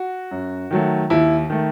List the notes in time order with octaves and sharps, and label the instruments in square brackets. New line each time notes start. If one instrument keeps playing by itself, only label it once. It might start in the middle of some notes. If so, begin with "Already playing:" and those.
Already playing: [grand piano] F#4
F#2
D#3 F#3 A3
D#2 E4
D#3 A3